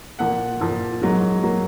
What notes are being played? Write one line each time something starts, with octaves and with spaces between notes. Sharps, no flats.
A#2 F3 A#3 F#5
A#2 F3 A#3
G#2 F#3 A#3
F#3 A#3